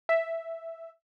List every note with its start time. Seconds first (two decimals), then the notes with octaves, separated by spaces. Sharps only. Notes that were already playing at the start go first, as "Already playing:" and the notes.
0.09 E5